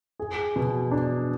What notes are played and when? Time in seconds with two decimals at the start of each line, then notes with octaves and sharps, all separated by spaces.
0.19 G#4
0.56 B2
0.91 D4